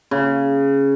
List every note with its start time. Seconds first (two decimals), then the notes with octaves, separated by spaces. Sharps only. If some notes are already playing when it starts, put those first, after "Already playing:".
0.11 C#3